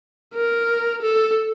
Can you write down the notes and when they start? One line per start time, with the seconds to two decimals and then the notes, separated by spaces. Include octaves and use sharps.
0.34 A#4
1.03 A4